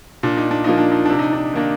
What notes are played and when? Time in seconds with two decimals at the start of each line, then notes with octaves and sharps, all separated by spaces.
0.23 A#2 D4
0.37 D#4
0.51 D4
0.64 F3 A#3 D4 D#4
0.78 D4
0.92 D#4
1.06 C3 D4
1.19 D#4
1.33 D4
1.54 D#3 A#3 D4